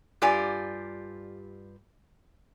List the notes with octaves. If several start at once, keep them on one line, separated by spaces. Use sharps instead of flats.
G2 F4 G4 D5 G#5